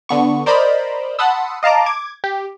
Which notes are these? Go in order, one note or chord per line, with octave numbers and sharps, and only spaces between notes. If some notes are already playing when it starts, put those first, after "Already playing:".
D3 B3 C#6
A#4 C5 D5 D#5 A#5 B5
F#5 A5 B5 C6 D#6 E6
D#5 F5 A5 A#5 D6
D6 G#6
G4